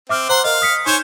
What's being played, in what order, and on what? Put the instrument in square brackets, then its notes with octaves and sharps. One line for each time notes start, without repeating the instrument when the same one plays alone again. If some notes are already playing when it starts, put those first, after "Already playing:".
[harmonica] C4 [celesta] E5 D6 F6
[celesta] C5 A#5 [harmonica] F#5 C6
[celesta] A#4 D#5 [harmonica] F5
[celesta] D#6 B6 C#7
[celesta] D#4 G6 E7 [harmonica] C5 C#5 G#5